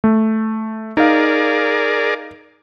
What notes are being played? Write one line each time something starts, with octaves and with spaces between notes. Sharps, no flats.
A3
D#4 G#4 A#4 D5 F5